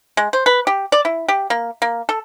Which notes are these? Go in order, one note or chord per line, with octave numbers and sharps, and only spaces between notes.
G#3
C5
B4
G4
D5
E4
G4
A#3
A#3
A4